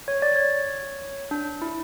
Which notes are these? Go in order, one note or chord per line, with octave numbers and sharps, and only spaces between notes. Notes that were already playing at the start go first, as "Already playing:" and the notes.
C#5
D5
C#5
D4
E4